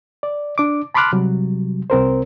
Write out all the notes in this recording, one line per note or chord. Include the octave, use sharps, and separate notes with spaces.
D5
D4 D6
A5 B5 C6 D6 F6 F#6
C3 F#3 G3
C2 C4 A#4 C5